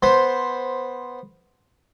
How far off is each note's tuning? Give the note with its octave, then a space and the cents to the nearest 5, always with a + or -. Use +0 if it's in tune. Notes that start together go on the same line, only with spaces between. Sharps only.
B3 +0 C5 +5